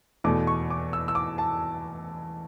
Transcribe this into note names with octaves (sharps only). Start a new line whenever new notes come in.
E2 B2 A3 D6
C#6
D6
E6
E6
D6
A5